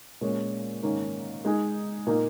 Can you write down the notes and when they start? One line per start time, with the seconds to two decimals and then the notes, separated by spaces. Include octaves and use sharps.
0.21 A#2 G#3 C#4
0.83 G#2 D#3 A#3 C#4
1.45 G#3 D#4 G#4
2.07 A#2 A#3 D#4